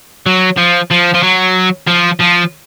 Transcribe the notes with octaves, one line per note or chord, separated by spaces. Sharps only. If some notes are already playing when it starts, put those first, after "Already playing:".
F#3
F3
F3
F3
F#3
F3
F3